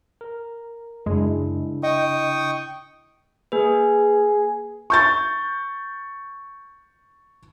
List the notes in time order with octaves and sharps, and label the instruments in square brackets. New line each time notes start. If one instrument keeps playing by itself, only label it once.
[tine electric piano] A#4
[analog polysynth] F#2 G#3 [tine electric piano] C#3 D4 E4
[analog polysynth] D#5 [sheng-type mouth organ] G5 C#6 D#6
[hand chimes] A#3 B4 [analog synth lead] G#4
[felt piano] C#6 G6 A6